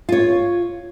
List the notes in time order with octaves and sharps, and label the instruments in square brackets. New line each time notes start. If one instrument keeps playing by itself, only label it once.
[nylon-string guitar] F4 C#5